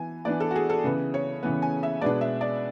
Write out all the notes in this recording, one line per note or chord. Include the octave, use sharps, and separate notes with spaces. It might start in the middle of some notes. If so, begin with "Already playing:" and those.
Already playing: E3 B3 G#5
E3 B3 D4 D5
A4
F#4
G#4
A4
C#3 E3 B3
C#5
C#3 E3 B3
G#5
E5
B2 G#3 B3 D4 D5
E5
D5